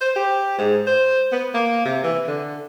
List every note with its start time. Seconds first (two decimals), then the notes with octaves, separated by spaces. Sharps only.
0.02 C5
0.16 G4
0.59 G#2
0.87 C5
1.33 B3
1.55 A#3
1.86 C3
2.04 E3
2.28 D3